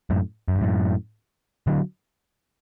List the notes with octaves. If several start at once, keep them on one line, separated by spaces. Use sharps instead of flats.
F#2 A2
F#2
G2
F#2 A2
D3 F#3